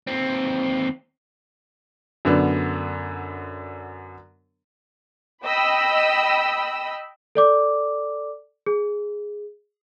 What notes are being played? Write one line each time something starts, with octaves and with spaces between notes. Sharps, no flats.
D#2 C4
F#2 D3 B3 D4
D#5 G5 B5 E6
A4 D5 D6
G#4